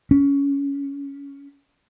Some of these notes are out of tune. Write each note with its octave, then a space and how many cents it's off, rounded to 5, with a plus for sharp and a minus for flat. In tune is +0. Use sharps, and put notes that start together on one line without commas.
C#4 +15